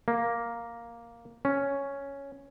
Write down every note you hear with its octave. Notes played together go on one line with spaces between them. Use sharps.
A#3
C#4